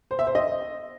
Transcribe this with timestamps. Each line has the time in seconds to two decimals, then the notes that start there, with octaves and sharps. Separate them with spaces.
0.11 C5
0.19 E5
0.27 C5
0.35 D#5